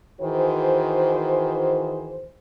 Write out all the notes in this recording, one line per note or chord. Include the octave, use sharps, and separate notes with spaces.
D#3 E3 F#4 G#4 C5